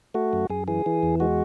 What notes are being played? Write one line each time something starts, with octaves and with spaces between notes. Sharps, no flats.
A3 F#4
F#2
F#2 G#4
E3 G#4
E3
E2
G#3 F#4